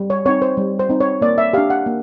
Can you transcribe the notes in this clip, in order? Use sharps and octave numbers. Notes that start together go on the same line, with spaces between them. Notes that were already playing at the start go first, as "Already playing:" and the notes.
Already playing: G3
C#5
C4 D#4 C#5
C5
G3
C5
C4 D#4
C#5
A#3 D5
E5
D4 G4 F5
F#5
A#3